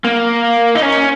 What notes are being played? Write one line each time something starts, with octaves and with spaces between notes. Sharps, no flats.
A#3
D#4
C#4